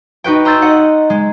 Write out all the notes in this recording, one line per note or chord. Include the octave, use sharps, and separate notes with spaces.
D#4 F#4 B4 G5
A#5 C6 E6 G6 A6
D#5 F#5
G#3